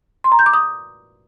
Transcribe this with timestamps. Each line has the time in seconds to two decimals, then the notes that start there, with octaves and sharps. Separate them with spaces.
0.24 C6
0.32 A#5
0.39 G6
0.46 D6
0.53 D#6